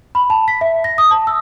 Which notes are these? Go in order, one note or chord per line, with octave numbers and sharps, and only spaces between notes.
B5
A5
B6
E5
A#6
D#6
A5
E6